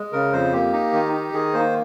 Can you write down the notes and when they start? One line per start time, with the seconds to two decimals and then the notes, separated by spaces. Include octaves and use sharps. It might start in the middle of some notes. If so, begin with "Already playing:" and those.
Already playing: G#3
0.13 C#3 A#4
0.32 F2 C5
0.53 A#3 G4
0.73 D#4
0.93 D#3
1.13 D#4
1.33 D#3 G#4
1.53 A#3 C5